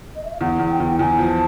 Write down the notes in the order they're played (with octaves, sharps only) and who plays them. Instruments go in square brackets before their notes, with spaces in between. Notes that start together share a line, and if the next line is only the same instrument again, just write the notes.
[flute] D#5
E5
F5
[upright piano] E2 [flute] F#5
[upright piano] E2
[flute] G5
[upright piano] E2
[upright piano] E2 [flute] G#5
[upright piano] F3
[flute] A5